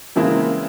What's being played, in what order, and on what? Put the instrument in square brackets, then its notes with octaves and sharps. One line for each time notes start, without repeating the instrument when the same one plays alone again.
[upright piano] C#3 E3 G#3 C4 E4 [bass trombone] A#3